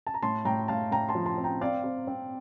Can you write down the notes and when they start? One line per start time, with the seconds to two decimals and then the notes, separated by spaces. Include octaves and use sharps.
0.07 A5
0.14 A#5
0.22 A2 A5 C6
0.45 A2 G5 A#5
0.68 A2 F5 A5
0.92 A2 G5 A#5
1.09 A5 C6
1.15 F3
1.26 A5 C6
1.38 C4
1.44 G5 A#5
1.61 C4 D5 F5
1.84 C4
2.07 C4